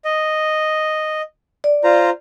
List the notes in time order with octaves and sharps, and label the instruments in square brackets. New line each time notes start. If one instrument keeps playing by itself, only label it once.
[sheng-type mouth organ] D#5
[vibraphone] D5
[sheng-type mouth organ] F4 C5 A#5